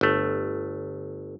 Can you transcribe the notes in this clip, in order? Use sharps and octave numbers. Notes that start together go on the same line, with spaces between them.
G1 A3